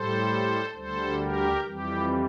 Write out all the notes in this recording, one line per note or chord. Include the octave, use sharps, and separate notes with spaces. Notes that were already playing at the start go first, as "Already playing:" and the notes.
Already playing: A2 G3 A4 C5
D2 D3 G3 A4 C5
G4 A#4
F2 E3 G3 G4